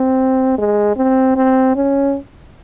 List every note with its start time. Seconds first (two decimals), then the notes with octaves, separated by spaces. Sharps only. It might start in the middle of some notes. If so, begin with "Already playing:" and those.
Already playing: C4
0.58 G#3
0.97 C4
1.36 C4
1.76 C#4